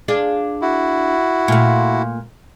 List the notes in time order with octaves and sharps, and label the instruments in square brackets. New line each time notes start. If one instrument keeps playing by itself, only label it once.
[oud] D4 F4 G#4
[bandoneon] E4 F#4
[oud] A#2 A3